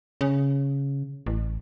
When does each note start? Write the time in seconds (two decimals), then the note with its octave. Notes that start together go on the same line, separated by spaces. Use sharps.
0.21 C#3
1.26 A1